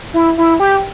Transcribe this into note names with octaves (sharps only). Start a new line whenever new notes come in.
E4
E4
G4